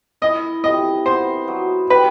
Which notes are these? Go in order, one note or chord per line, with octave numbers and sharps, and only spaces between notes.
E4 D#5
C3 D#5
B3 C5
F#3
G4 B4